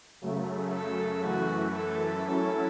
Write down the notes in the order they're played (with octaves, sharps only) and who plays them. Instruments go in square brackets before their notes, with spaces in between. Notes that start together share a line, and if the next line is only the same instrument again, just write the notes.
[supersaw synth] F#2 C#3 F#3 A3
[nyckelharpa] A4
[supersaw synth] F#2 E3 A3 [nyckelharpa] F#4
[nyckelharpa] A4
[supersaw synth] F#3 C#4 E4 [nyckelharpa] A4